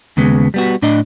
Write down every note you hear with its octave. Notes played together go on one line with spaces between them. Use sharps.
D#2 C#3 G#3 B3
G3 B3 F#4
A2 D4 D5 D#5